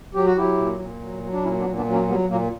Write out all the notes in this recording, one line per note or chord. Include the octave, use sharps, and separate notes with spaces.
F#3 G4
F#4
F#3 E4 G4
A#2
A#2
F#3
F#3
D4
A#2 C#4 E4
B3 D4
A#2
B3 D4
F#3
A#3 C#4
F#3 G3 B3
A#2 F#3 A#3